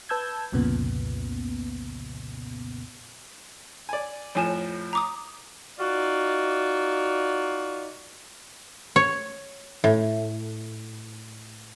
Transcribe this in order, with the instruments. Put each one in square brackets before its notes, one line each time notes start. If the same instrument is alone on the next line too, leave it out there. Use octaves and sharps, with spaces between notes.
[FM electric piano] B4 A5 E6 G6 G#6
C2 F2 A#2 C#3 B3
[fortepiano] D5 G#5
[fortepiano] F2 A2 F3 [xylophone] C#5 G#5 E7
[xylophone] A#5 D6 D#6
[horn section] D#4 F4 F#4 D5
[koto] C#5
A2